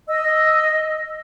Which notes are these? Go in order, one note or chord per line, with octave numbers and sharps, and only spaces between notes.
D#5 E6